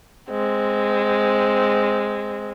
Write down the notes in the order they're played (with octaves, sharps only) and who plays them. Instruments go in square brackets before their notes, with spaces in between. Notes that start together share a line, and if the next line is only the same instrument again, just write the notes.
[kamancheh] G#3 C4